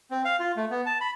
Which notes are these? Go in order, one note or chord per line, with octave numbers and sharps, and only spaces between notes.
C4
F5
F4
A3
B3
A5
B5